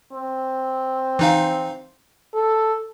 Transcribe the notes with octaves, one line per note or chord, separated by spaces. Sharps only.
C4
E3 D#4 F5
A4